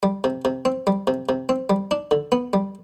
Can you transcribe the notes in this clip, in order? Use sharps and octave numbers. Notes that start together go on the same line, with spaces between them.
G3
C3
C3
C4
G3
C3
C3
C4
G3
D4
D3
B3
G3